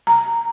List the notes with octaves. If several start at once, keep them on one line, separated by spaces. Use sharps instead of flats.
A#5